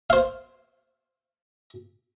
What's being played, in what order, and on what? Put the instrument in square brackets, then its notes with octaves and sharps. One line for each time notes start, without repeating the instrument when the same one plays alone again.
[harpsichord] C5 F5